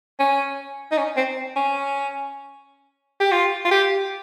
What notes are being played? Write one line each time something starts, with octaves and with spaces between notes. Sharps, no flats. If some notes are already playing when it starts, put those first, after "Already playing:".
C#4
D#4
C#4
C4
C#4
G4
F4
F4
G4